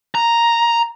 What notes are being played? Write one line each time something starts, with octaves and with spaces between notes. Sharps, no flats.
A#5